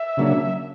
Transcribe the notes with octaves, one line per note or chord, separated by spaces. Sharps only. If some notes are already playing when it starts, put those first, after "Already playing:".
Already playing: E5
C#3 F#3 A#3 D4